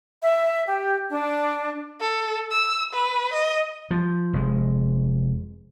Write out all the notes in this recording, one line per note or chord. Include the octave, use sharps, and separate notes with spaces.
E5
G4
D4
A4
E6
B4
D#5
F3
F1 G#3